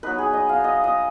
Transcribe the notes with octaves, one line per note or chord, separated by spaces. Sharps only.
F#3 B3 D#4 B4
G#4
D#5
F5
D#5
D#5